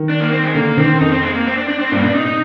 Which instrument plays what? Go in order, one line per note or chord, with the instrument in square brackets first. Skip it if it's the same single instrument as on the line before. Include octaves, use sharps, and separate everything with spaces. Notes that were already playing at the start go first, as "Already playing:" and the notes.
Already playing: [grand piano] D#3
[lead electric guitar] D4
A#3
C4
G#3
[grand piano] D3 [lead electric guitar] A#3
[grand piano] D#3 [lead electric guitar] C4
[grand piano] F2 [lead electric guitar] D#4
[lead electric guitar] C4
G#3
A#3
C4
D4
D4
C4
[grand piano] G2 [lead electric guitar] A#3
[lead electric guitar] C4
[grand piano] A#2 [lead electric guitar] D4
[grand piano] C3 [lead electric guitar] D#4
[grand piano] C3 [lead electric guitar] D#4